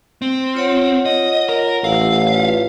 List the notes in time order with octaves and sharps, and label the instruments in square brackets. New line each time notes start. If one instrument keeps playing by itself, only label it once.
[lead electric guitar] C4
[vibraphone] F4 C#5 F#5
[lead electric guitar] D#5
A#4
[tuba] A1 [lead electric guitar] F5 [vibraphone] F#5 E6
[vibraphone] F4 B4 D5